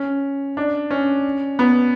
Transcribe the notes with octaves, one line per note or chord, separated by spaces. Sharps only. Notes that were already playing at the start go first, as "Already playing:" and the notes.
Already playing: C#4
D4
C#4
B3